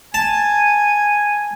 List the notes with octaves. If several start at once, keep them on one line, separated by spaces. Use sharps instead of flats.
G#5 A5